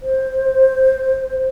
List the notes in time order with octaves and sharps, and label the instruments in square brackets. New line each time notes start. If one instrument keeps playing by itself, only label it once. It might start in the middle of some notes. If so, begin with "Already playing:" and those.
[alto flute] C5